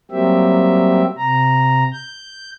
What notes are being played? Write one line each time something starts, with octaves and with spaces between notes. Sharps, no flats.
F#3 G3 A#3 C4 G4 E5
C3 A#5
G6